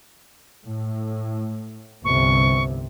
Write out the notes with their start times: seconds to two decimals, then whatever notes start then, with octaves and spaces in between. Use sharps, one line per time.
0.65 A2
2.05 G1 C2 C3 C#6